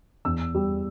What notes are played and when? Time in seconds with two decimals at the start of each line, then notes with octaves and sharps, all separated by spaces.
0.25 E2 E6
0.55 G3